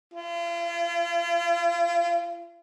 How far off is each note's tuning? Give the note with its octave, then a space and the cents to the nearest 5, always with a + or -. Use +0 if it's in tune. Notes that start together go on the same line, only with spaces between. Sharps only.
F4 -40